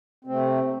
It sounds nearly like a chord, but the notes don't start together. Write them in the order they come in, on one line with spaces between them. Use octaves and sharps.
C4 C3 A3